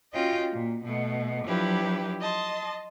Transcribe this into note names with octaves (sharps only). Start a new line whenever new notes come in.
C#4 F4 F#4 D#5 G5
A#2
B2 A3
F3 F#3 D4 E4 G4 B4
D#5 A5 C6